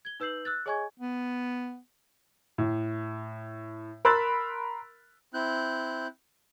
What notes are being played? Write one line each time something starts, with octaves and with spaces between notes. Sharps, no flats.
G#6 G7
D#4 B4 E6 G6 C7 F#7
E6 F#6 A6
G#4 C#5 D#5 G#5 C#6 G#6
B3
A2
A#4 B5 C6 E6 F#6 A6
C4 E4 F#6 G6